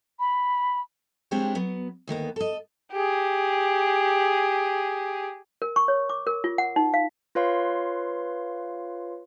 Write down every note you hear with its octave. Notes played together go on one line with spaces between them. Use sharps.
B5
F3 G#3 C4 D4 G4 C#5
F#3 B3
D2 D#3 A#3 B3
A4 D#5
G4 G#4
A#4
C#6
C#5
D6
A#4
F4
F#5
D#4
F5
F4 B4 C#5 F5 C6